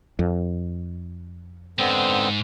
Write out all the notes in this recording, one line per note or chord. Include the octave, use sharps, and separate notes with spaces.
F2
G#2 D3 B3 C4